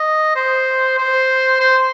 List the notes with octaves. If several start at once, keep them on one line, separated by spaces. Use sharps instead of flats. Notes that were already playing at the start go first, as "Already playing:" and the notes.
Already playing: D#5
C5
C5
C5